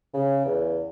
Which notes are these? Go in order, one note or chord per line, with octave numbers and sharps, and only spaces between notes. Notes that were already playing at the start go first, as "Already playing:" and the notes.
C#3
E2